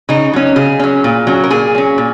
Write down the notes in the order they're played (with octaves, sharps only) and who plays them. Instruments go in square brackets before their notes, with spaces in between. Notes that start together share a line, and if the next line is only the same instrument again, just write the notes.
[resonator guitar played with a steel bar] C#3 D#4
F#3 C#4
C#3 G#4
F#3 C#4
A#2
F#3 C#4
A#4
A#2 G#4
F#3 C#4
A#2